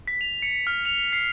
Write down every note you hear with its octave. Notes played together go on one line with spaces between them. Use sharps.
B6
F7
C#7
F6
F7
C7